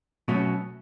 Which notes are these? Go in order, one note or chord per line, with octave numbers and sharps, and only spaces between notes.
B2 F#3 A3 C#4